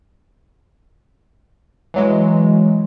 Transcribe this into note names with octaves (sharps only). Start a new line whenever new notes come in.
E3 F#3 G#3